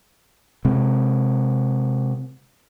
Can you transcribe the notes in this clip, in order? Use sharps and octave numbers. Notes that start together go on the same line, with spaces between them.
C3 G#3